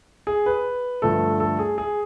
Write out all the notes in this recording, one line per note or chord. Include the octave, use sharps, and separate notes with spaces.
G#4
B4
G2 D3 F3 A3 A4
A4
G#4
G#4